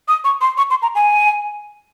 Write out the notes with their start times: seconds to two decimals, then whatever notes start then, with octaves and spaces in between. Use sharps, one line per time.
0.08 D#6
0.24 C#6
0.41 C6
0.58 C#6
0.70 C6
0.82 A#5
0.95 G#5